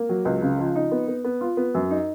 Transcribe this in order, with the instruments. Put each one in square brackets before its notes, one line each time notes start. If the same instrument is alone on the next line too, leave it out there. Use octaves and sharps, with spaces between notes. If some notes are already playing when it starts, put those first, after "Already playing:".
Already playing: [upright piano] A#3
F#3
C#2
C#3
F3
D#4
B3
B3
B3
F4
B3
F#2
D#4